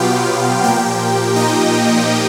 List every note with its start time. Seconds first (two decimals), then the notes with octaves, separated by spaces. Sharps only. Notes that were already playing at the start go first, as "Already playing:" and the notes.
Already playing: B2 F#3 B3 F4 G4 F5 G5
0.63 A#2 F3 A#3 G4 G5
1.36 D#4 D#5